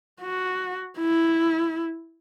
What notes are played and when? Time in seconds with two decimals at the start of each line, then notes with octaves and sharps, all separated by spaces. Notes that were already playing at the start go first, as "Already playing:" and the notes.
0.21 F#4
0.99 E4